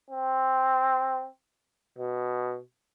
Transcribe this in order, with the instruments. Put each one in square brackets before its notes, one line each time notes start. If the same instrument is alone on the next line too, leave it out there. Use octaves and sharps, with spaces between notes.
[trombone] C4
B2